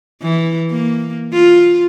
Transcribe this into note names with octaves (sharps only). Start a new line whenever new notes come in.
E3
A#3
F4